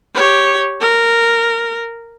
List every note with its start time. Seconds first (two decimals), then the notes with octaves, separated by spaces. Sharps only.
0.15 G4 C#5
0.81 A#4